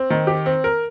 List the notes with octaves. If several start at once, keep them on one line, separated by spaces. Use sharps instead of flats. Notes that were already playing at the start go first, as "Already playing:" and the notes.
Already playing: C4
D#3
G4
C4
A#4